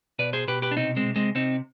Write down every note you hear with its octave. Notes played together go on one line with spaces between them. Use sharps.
B2 B4 D5
G#4 C5
B2 G4 B4
G4 B4
D4
C3 C4 D#4
G#3 C4
C3
G#3 C4
C3 C4 D#4